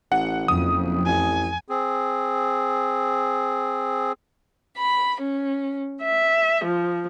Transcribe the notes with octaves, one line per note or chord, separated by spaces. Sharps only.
A1 F#5
F#1 F2 D#6
A1 G#5
C4 G#4
B5
C#4
E5
F3